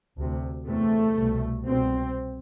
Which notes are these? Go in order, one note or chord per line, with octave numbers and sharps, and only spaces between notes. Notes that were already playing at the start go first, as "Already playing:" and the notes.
D2 C3
E2 C3 A3
C2 B2
C2 B2 C4